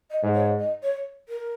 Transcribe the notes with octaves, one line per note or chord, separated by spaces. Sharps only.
D#5
G#2
C#5
D#5
C#5
A#4